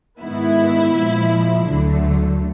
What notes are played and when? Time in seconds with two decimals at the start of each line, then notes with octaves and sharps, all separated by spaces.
0.21 G#2 D#3 G#3 B3 E4
0.94 A#2 F3 G#3
1.67 D2 D3 F#3 A3